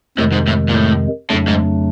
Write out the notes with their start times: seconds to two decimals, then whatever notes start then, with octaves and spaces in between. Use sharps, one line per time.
0.18 F2 A2 C3 D#3 G#3
0.32 G#2
0.47 A2
0.68 A#2
0.74 A2
1.29 F2 A2 C#3 F#3 A3 D4
1.48 G#2